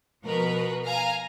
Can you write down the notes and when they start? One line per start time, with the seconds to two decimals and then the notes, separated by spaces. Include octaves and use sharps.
0.23 B2 F3 A#4 B4
0.85 F5 G#5 A#5